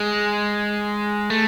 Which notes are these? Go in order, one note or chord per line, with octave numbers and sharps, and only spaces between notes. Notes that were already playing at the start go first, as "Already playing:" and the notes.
Already playing: G#3
A3